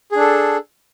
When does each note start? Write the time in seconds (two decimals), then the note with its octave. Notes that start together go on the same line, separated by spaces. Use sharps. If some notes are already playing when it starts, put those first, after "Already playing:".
0.12 G#4
0.16 D4
0.20 A4